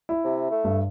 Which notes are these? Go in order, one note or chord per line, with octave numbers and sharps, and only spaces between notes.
E4
C3
A3
G2